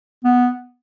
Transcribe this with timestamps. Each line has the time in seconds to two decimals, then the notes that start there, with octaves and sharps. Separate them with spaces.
0.24 B3